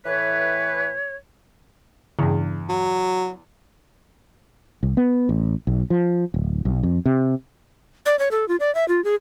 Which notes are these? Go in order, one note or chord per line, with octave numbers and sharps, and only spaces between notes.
A2 E3 B4 C#5
E2 G2 C#3
F#3
C2
B3
A1
B1
F3
D1
B1
F2
C3
D5
C#5
A4
F4
D5
E5
F4
G#4